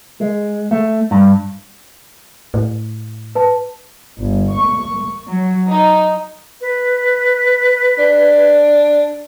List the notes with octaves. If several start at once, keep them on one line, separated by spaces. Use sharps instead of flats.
G#3
A3
G2
A2
B4 A5
G1
C#6
F#3
D#4
B4
D4